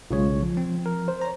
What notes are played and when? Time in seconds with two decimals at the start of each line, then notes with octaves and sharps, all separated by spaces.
0.11 B1 C#3 G#3 F4 C#5
0.43 F3
0.57 C4
0.86 A#4
1.08 C5
1.22 C#5 A#5